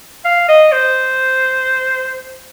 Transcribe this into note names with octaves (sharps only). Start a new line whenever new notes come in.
F5
D#5
C5